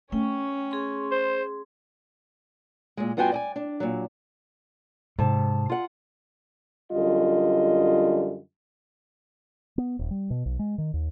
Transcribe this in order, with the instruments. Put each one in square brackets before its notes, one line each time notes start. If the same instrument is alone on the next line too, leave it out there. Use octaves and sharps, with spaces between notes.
[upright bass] A3 [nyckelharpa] C#4 C#5 [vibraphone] G5
[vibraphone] G#4 C6
[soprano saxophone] C5
[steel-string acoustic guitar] A#2 G#3
G2 B3 F4 F#4 G5 G#5
D5 D#5 G#5
D4
A#2 F#3
[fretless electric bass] G#2 [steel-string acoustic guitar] C3 A5
[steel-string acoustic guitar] F4 F#5
[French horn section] F#2 D3 G3 F4 D#5
[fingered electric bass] B3
D#1
G3
B2
B1
G#3
D#3
D#2